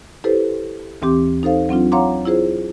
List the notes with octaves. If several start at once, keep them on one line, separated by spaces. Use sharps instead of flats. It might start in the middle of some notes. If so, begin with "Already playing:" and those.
E4 G4 A4 B4 C5
D#2 E3 C4 G4 D6
D#4 A4 C5 F5
F#3 C4 D4 F4
C#5 F5 F#5 A#5 C6 D6
E4 F4 G#4 C5